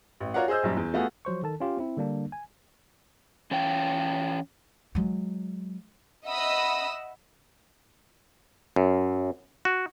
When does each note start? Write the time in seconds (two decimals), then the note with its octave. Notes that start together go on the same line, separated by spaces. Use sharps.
0.20 A1
0.34 F4 F#4 A#4 C#5 D5 F#5
0.48 G#4 C5 D#5 E6 G6
0.63 A#1 F#2 G3
0.76 E2
0.94 A3 B3 F4 F#4 G#4
1.25 F3 F#3 C5 C#6
1.43 D#3 A4 A5
1.60 C#4 F4 G4
1.77 C4 E4
1.97 D3 G3 A#3 D4
2.32 G#5
3.51 E3 C#4 C#5 F5 G5
4.95 F#3 G#3
6.26 D#5 E5 F#5 B5 D#6 E6
8.76 F#2
9.65 F#4